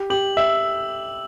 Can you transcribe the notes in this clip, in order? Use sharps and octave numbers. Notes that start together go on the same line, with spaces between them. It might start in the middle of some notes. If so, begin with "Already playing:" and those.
Already playing: G4
G4 F#7
E5 E6